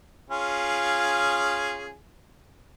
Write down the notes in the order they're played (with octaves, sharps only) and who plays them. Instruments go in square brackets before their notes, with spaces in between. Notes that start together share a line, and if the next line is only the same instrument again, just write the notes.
[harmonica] C#4 F4 G#4